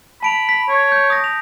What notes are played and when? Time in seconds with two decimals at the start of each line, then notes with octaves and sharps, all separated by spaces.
0.23 A5 B5 D7 F7
0.49 B6
0.69 C#5
0.92 G6
1.10 D#6 A#6
1.24 F7